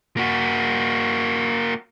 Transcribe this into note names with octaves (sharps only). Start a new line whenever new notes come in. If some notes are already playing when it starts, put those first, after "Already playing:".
A#3 F#4